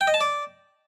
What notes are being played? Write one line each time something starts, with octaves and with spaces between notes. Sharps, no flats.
G5
D#5
A5
D5